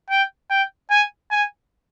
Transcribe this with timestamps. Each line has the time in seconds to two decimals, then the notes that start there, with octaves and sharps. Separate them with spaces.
0.10 G5
0.50 G5
0.90 G#5
1.31 G#5